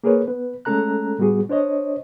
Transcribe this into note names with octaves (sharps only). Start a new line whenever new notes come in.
A#3 G#4 A#4 B4 C#5
B3 B4
G#3 A3 C#4 A4 A#5 F#6
A2 G3 B3 F#4 G#4
D4 C5 C#5 D#5